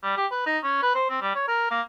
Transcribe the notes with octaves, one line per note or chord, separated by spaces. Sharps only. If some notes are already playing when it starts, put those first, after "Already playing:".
G3
G4
B4
D#4
C#4
B4
C5
C4
G3
C#5
A#4
A#3